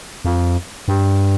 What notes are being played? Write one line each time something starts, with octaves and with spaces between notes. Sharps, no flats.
F2
G2